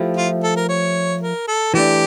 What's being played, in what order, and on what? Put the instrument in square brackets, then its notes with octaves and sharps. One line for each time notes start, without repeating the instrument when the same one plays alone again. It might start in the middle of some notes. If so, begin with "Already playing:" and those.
Already playing: [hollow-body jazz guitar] F3 A3 E4 G4
[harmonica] F4
A4
A#4
C#5
A#4
A4
[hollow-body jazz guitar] E3 A3 D4 [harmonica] G4